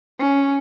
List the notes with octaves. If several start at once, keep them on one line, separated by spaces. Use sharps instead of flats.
C#4